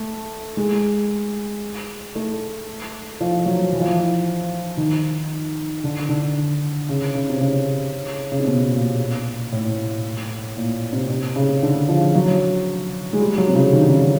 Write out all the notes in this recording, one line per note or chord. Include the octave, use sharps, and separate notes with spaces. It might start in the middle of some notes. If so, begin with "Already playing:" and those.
Already playing: A3
G#3
A3
F3
F#3
E3
F3
E3
D#3
D3
D3
C#3
C#3
C3
C#3
C#3
C3
B2
A#2
A2
A#2
C3
C3
C#3
D3
F3
F#3
G#3
G3
F#3
C3
C#3
D#3
D3
C#3
D3